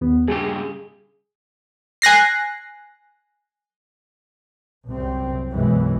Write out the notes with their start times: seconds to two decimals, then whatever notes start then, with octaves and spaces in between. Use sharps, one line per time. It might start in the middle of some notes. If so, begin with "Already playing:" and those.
0.01 D#2 B3
0.28 G2 C#3 G4 G#4
2.02 G#5 F#6 A#6 C7
4.89 C2 F#2 C4
5.50 B1 F#2 E3 G#3